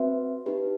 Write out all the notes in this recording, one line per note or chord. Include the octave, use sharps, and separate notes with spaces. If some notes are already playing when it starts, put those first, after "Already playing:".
Already playing: C4 F#4 B4 E5
D#4 G4 B4